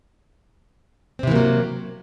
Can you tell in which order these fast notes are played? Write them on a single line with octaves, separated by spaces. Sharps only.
C4 C3 E3 A#3 F#3